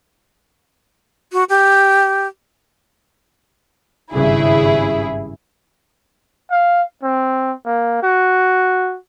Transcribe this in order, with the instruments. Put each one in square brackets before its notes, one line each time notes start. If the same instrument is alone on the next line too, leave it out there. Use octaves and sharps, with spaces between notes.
[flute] F#4
G4
[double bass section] G#1 G2 C#3 [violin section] E4 G#4
[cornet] F5
C4
A#3
F#4